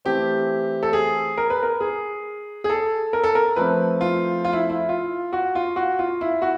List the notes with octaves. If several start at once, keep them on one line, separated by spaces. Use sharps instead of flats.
E3 A3 C4 G4
A4
G#4
A#4
B4
A#4
G#4
G#4
A4
A#4
A4
A#4
F3 A3 C4 B4
F4
F4
E4
E4
F4
F#4
F4
F#4
F4
E4
F#4